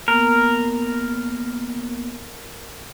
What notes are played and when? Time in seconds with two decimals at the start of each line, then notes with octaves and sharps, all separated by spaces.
0.08 A#3 B3 A#4